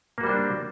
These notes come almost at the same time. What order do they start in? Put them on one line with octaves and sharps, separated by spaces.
A#3 F#4 G3 C5 D4